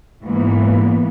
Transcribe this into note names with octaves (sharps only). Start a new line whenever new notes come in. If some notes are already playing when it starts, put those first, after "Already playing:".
G#2 E3 A#3 B3